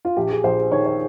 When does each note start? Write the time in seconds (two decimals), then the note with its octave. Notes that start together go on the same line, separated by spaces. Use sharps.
0.05 F4
0.17 A#1 G4
0.30 G#4
0.44 A#1 C5
0.72 D#3 C#5
0.86 C#5